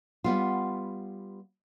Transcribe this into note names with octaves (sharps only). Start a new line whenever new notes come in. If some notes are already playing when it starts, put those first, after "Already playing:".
G3 B3 F4